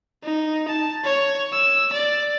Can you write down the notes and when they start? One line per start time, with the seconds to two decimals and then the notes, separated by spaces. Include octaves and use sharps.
0.23 D#4
0.68 A5
1.04 C#5
1.52 E6
1.93 D5